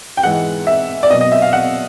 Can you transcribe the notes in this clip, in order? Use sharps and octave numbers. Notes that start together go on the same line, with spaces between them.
G5
G#2 E3 G#3 F#5
E5
D5
B2 F#3 D#5
D#5
E5
F5
F#5